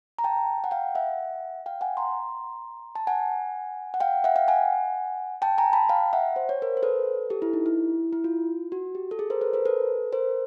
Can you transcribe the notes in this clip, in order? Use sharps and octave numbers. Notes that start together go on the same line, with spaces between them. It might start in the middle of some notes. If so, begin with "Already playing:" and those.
A#5
G5 A5
F#5
F5 G5
E5 F#5
F5 G5
F#5 G#5
A#5 C6
A5
F#5 G#5
F#5
F5 G5
E5 F#5
F5 G5
F#5 G#5
G5 A5
G#5 A#5
A5 B5
F5 G5
E5 F#5
C5
C#5
A#4 C5
C5
A4 B4
G4 A4
E4
D#4
E4
E4
F4
F#4
G4
A4
G#4
A#4 C5
A4 B4
A#4 C5
A4 B4
A#4 C5